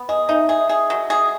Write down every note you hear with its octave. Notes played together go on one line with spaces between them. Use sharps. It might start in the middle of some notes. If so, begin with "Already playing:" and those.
Already playing: B3
G#4 D#5
D#4 E5
G#4 E5
G#4
F#3
G#4